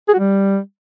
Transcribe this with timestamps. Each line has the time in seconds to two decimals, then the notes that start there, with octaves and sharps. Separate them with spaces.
0.09 G#4
0.14 F#4
0.19 G3